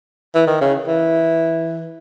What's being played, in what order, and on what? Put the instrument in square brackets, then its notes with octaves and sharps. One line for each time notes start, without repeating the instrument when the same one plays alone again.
[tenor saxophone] E3
D#3
C#3
E3